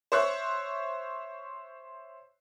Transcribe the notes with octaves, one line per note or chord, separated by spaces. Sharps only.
C5 C#5 E5 C#6 F#6